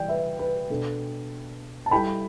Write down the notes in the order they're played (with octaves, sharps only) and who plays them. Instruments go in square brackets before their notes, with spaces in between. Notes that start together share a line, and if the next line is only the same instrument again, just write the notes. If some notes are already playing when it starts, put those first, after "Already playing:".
Already playing: [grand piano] E3 G3 [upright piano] D5 G5
[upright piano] B4 E5
B4
[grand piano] B2 B3 D4 A4
[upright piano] A5
[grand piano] G3 E4 A4 [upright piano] G5 B5